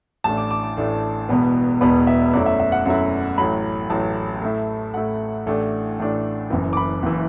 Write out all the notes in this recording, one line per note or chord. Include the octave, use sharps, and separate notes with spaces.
A1 A2 A3 D4 A5
D6
D6
D6
A1 A2 A3 D4
E1 E2 B2 B3
E1 E2 B2 B3 B5
E5
F#2 F#3 A3 E4 D5
E5
E5
F#5
F#2 F#3 A3 E4 F#5
A1 A2 F#3 B5
A1 A2 F#3 A5
A2 A3 E4
A2 A3 E4 F#5
A1 A2 A3 D4
A1 A2 A3 D4
F#1 F#2 E3
D6
B5
F#1 E3